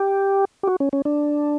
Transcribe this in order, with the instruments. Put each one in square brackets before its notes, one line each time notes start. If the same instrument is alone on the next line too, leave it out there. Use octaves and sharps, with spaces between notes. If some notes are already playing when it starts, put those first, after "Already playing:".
Already playing: [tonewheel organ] G4
G4
F#4
C#4
C#4
D4